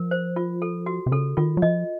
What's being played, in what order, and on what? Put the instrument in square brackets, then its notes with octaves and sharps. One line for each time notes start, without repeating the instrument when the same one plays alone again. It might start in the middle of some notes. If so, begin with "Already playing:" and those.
Already playing: [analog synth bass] F3 [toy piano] A#4
[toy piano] C5
F4
A4
F#4
[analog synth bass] C3
[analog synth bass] C#3 [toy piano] A4
[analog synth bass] D#3 [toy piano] F4
[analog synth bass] F#3
[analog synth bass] F3 [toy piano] D#5